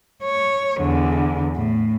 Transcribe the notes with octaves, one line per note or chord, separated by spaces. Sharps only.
C#5
E2 D3
A2